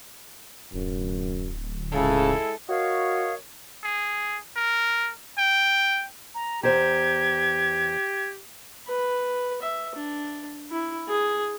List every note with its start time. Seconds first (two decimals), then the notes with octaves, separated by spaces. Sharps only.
0.73 D1 F#2
1.93 C#2 C#3 G#3 E4 A4
2.68 F#4 A#4 C#5 D#5 F5
3.84 G#4
4.56 A#4
5.38 G5
6.35 A#5
6.63 E2 G4 C5 A#5 G#6
8.87 B4
9.62 E5
9.95 D4
10.70 E4
11.09 G#4